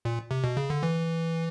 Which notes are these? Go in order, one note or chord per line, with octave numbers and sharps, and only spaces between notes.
A#2
C3
B2
C#3
D3
E3